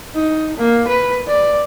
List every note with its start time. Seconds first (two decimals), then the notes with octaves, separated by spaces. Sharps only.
0.15 D#4
0.57 A#3
0.88 B4
1.27 D5